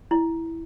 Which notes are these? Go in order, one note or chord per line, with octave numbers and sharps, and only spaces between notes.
E4